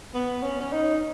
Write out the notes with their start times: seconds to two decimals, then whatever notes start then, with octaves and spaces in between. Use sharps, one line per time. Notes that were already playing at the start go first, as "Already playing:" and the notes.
0.14 B3
0.43 C#4
0.61 C#4
0.72 D#4